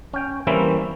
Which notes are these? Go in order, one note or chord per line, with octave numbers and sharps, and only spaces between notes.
C#4 G5
E3 G3 A#3 C4 C#4 E4